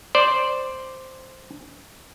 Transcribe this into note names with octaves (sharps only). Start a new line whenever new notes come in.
C5 D5